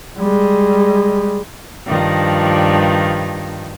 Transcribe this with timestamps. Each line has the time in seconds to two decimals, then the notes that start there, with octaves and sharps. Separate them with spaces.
0.18 G3 G#3
1.87 G2 D#3 F3